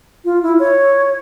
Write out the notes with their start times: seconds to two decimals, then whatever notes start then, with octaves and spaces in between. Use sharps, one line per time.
0.25 F4
0.43 E4
0.59 C#5